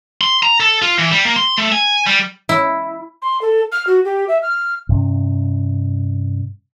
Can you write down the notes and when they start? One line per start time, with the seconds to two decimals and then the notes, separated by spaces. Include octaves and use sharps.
0.21 C6
0.43 A#5
0.60 A4
0.82 F4
0.99 E3
1.11 G3
1.25 A#3
1.36 C6
1.58 A3
1.72 G#5
2.07 G3
2.49 E4
3.22 C6
3.41 A4
3.72 F6
3.87 F#4
4.05 G4
4.28 E5
4.42 F6
4.89 G2 C3 C#4